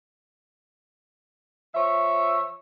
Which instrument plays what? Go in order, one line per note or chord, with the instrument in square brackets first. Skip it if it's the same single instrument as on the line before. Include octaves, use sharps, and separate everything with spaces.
[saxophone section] F3 C#5 E5